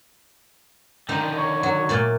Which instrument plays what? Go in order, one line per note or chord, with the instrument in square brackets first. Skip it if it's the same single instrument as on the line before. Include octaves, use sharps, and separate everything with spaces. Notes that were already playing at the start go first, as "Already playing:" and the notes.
[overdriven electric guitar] D3 D#3 [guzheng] D#4 [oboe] G5
[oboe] C#5
[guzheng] F#3
A#2 A3 D5